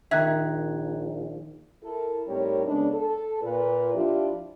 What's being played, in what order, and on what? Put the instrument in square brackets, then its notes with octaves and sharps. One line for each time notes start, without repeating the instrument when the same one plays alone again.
[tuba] A#1 [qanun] D#3 [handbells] E5 [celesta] A#5 F#6 G#6
[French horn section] E4 A4 A#4
A2 G3 C4 D#4 A#4 C#5
C#3 G#3 B3 D4
A4
A#2 B4
F3 D4 E4 F4 G4